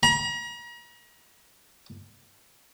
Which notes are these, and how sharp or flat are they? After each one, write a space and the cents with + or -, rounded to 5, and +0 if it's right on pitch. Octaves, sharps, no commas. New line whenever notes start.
A#5 +40